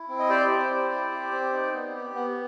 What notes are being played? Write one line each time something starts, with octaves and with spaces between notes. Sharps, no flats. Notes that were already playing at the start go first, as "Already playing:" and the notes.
Already playing: E4
C4
D#5
G4 C5 D5
C4
E4
C4
G4
C4
D#4
B3
G4
B3